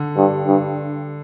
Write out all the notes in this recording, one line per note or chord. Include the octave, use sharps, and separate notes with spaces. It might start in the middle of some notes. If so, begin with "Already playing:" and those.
Already playing: D3
G2
G2